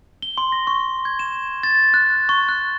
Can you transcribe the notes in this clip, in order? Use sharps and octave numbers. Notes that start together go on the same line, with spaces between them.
G7
C6
A#6
C#6
G#6
E7
A6
F#6
C#6
F#6